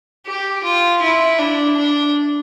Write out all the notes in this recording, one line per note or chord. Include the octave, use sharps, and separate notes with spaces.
G4
F4
E4
D4
D4